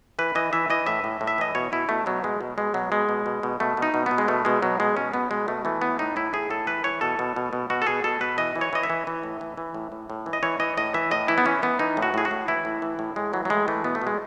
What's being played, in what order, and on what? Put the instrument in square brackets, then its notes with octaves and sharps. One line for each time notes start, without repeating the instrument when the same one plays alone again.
[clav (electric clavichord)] E3 B4
E3 D#5
E3 E5
E3 D#5
A2 E5
A2
A2
E5
E3 D#5
B2 C#5
B2 E4
B2 A3
B2 F#3
B2 G#3
B2
B2 G#3
B2 F#3
B2 G#3
B2
B2
B2
B2 A3
B2
D#4
B2
B2 B3
G#3
B2 A3
B2 G#3
B2 F#3
B2 G#3
B2 C#4
B2 B3
B2 G#3
B2 A3
E3 A3
A2 B3
A2 D#4
A2 E4
A2 G#4
A2 A4
E3 B4
E3 C#5
B2 A4
B2
B2
B2
B2 F#4
A4
B2 G#4
B2 A4
B2 B4
E3 D#5
E3
C#5
E3 D#5
E5
E3
E3
A2
E3
E3
A2
A2
A2
E3
D#5
E3 C#5
E3 D#5
A2 D#5
E3 E5
A2 D#5
E3 E4
B3
E3 C#4
E3 B3
E3 D#4
A2
F#4
A2 G#4
F#4
A2
E3 E4
A2
E3
A2
A2 G#3
E3 F#3
F#3
A2 G#3
E3 A3
B2 B3
A3
B2
G#3